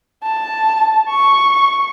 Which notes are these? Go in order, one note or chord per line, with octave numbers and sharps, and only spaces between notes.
A5
C#6